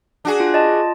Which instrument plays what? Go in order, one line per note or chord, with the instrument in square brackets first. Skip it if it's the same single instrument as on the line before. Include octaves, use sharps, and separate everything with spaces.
[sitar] D4 F#4 G#4
[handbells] F4
D5 D#5 A5
F4